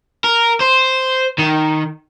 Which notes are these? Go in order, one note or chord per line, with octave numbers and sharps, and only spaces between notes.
A#4
C5
D#3